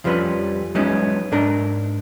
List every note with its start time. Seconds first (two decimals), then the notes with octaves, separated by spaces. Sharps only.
0.04 F2 F3 G3 C#4 B4
0.75 F#3 G#3 B3 C#4 D#4 E4
1.32 G#2 D4 A#4 A#5